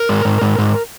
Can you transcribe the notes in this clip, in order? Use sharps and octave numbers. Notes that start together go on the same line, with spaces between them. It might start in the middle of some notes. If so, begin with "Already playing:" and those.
Already playing: A#4
G#2
G#2
G#2
G#2